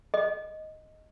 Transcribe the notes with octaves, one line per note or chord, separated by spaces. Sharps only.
D#5